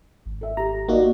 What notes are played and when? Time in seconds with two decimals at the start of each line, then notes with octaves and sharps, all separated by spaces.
0.26 G#1
0.41 A4 E5
0.57 G4 A#5
0.88 A#3 D#4 F#4 D5 D#5 F#5